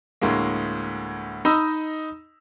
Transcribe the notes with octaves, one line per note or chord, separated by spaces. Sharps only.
D2 A2 G#3 A#3
D#4 D#5 B5 E6